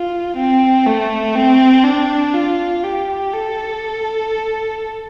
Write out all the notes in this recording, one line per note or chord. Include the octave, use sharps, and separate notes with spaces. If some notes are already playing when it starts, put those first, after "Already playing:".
Already playing: F4
C4
A3
C4
D4
F4
G4
A4